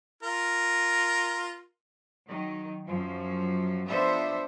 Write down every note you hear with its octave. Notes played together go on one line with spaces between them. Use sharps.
F4 A#4
D#3 F#3
F#2 F3 F#3
F3 B3 D4 A4 C5 E5